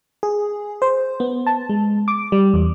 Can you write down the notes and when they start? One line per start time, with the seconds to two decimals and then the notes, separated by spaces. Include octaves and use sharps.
0.23 G#4
0.82 C5
1.20 B3
1.47 A5
1.69 G#3
2.08 D6
2.32 G3
2.53 E2